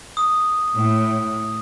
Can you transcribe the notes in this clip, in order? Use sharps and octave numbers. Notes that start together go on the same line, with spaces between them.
D#6
A2